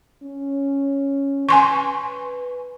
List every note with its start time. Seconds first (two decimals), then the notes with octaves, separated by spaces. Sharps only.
0.23 C#4
1.49 B4 G#5 C6 C#6